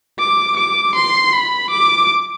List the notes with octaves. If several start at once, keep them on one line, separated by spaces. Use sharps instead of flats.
D6
D6
C6
B5
D6